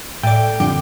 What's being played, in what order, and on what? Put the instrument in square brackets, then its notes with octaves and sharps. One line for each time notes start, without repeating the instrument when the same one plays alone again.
[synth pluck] A2 D5 [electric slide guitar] G5
[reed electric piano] F2 D3 [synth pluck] G3